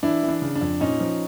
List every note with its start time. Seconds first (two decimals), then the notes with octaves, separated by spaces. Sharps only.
0.03 E3 D4 E4
0.23 E3
0.29 D4
0.42 C#3
0.56 D4
0.61 F2
0.80 A#2 C#4 D#4
1.00 F3